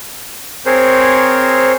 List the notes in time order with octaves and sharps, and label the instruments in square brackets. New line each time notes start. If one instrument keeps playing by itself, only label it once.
[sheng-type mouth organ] C4 G#4 A#4 C5 C#5